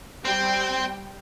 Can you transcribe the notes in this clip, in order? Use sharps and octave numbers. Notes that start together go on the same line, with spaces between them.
G3 C4 C5 G5